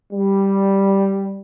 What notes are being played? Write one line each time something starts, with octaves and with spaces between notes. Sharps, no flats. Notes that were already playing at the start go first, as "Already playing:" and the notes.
G3